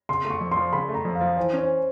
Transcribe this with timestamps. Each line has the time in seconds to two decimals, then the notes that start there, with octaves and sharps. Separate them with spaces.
0.09 C#3 C6
0.25 A3
0.30 C#6
0.41 F2
0.51 C6
0.57 F3
0.73 C#3 B5
0.89 A3
0.94 A#5
1.05 F2
1.15 F5
1.21 F3
1.37 E3 C5
1.53 C#4
1.58 C5